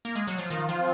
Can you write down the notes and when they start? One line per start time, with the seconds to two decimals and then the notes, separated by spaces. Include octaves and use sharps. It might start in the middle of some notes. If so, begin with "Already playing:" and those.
0.05 A#3
0.15 G#3
0.28 F#3
0.38 F3
0.50 D#3 F4
0.69 F3
0.78 C4